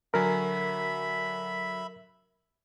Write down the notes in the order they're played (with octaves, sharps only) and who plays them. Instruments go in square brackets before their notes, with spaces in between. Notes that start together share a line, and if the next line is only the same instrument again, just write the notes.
[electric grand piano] D3 F#3 G#5 [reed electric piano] A#4 [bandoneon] E5 B5